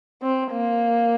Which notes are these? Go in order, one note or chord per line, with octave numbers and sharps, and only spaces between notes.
C4
A#3